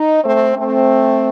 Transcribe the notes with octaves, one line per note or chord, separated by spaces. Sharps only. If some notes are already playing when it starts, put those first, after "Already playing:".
Already playing: D#4
A3 C4
A3 C4